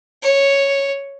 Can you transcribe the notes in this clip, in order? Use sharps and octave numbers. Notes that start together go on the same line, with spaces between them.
C#5